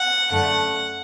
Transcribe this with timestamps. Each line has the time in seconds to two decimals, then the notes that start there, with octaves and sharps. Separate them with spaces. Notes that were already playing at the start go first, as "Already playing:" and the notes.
Already playing: F#5
0.31 F#2 D3 A3 F#5